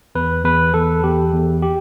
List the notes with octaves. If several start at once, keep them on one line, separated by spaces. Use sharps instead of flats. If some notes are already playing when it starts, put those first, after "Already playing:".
E2 B4
E2 B4
E2 A4
E2 G4
E2
G4